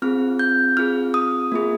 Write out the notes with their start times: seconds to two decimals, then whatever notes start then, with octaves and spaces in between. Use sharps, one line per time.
0.02 C4 F4 G#4 F6
0.39 G6
0.77 C4 F4 G#4 F6
1.14 D#6
1.52 A#3 F4 G#4